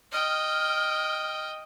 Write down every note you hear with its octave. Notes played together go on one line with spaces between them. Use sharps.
D#5 G5 F6